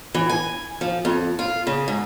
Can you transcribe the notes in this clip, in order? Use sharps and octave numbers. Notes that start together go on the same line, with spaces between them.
E3
G#5
F3
F2
F4
C#3
G#2